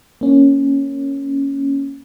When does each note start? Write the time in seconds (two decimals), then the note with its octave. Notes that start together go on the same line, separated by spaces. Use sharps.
0.21 A#3 C#4